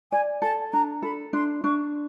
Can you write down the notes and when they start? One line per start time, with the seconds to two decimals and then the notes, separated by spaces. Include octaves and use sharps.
0.12 D5 G#5
0.42 A4 A5
0.72 D4 A#5
1.02 A4 B5
1.33 D4 C6
1.64 D4 C#6